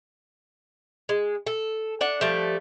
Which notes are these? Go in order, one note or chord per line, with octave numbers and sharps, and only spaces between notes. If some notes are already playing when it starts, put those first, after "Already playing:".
G#3
A4
D4 F#5
F3 G3 A3